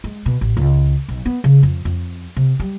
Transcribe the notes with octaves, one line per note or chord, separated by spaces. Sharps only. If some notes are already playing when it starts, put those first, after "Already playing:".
G#3
B2
A1
C#2
B1
B3
C#3
F2
F2
C3
G3